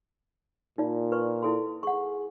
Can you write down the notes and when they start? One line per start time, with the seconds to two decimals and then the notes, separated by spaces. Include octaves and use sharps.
0.78 A#2 D#4 F4 D5
1.12 B4 D5 C#6
1.42 E4 A4 C6
1.83 G#4 F#5 C#6